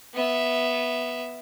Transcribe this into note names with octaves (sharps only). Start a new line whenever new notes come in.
B3 E5